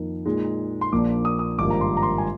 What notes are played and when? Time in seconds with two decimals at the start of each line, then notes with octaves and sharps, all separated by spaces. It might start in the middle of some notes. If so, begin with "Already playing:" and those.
Already playing: F2 D#3 A#3 D#4
0.25 A#2 G#3 D#4
0.81 C6
0.92 A#1 A#2 F3 A#3 D4 D6
1.25 D#6
1.39 D#6
1.59 G#1 G2 F3 A#3 D6
1.70 A#5
1.81 C6
1.97 A#5
2.03 C6
2.18 G#5